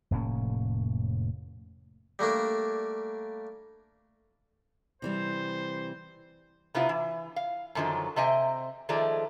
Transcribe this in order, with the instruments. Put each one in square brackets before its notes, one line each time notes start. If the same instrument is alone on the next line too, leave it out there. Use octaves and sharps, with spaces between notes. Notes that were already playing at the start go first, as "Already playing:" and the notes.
[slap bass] F1 A2 A#3 C#4
[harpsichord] G3 A3 A#3 D4
[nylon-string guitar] C3 E3 G3 [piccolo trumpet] C5
[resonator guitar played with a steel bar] C3 B3 E4 F4
E3
F5
F#2 D3 D#3 F3 F#3
C3 C4 D#5 E5 G#5
D#3 F3 G#3 A3 D5